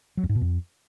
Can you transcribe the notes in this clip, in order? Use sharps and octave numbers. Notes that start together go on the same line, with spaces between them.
F#3
F2
G#2
B2
F2